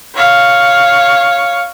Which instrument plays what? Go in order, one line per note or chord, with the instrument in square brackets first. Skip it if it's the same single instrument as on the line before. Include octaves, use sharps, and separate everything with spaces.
[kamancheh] C#5 F5